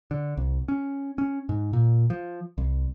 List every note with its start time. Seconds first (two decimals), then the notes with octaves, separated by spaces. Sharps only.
0.11 D3
0.37 C2
0.68 C#4
1.18 C#4
1.49 G#2
1.73 A#2
2.10 F3
2.58 C2